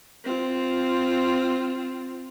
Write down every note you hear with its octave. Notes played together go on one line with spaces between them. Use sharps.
C4 F4